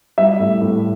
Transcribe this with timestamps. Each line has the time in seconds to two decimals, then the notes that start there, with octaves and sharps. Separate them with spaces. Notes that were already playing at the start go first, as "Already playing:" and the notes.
0.18 G3 E5
0.40 A2
0.62 A2